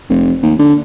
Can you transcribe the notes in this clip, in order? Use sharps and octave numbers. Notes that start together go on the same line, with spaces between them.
F1
D#2
D3